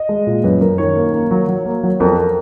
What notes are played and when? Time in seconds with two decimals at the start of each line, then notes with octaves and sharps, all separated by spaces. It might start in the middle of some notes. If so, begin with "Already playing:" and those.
Already playing: D#5
0.09 G#3
0.27 A#2
0.44 F#2 B4
0.61 F#2 A#4
0.78 D#3 C#5
0.96 A#3
1.14 A#3
1.31 F#3
1.48 F#3
1.65 A#3
1.83 F#3
2.00 F2 A#4